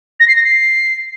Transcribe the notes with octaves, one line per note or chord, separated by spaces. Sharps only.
A#6
C7
A#6
C7